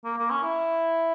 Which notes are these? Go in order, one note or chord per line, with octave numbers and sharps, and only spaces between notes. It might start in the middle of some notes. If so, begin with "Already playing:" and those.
A#3
A#3
C#4
E4